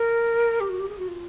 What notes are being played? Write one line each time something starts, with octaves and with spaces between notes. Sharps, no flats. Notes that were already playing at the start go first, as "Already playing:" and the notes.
Already playing: A#4
G4
F#4
G4
G#4
F#4
F4